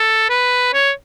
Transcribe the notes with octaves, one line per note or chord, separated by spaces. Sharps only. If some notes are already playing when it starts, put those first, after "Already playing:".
Already playing: A4
B4
C#5